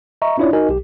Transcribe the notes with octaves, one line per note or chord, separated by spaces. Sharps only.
D#5 E5 A#5 C#6
C#4 D4 E4 F4 C#5 D5
D#4 F#4 A#4 D#5 G#5
B1 G4